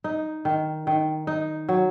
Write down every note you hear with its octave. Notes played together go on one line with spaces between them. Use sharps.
D#4
D#3
D#3
D#4
F#3